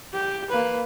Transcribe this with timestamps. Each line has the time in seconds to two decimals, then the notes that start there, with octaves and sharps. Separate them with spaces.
0.13 G4
0.50 A#3 B4